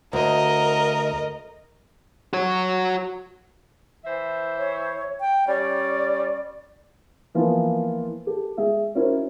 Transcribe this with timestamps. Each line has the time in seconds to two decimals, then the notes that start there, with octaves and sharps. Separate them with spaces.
0.13 D2 A#4 D#5
2.33 F#4 C#5
4.05 E3 C5 E5
4.58 C#5
5.20 G5
5.48 G3 C#4 D5
7.35 E3 F3 A#3 B3 F4
8.27 G4 A4
8.57 G#3 G#4 E5
8.95 C#4 D#4 E4 F#4 A#4 C5